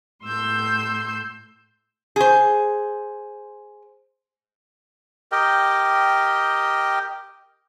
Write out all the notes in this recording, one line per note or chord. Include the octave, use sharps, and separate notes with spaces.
A2 C6 E6 G6
G#4 C5
G4 A#4 D#5 G5